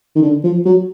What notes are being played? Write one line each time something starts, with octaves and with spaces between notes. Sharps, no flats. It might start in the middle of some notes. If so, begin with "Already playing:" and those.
D#3
D3
F3
F#3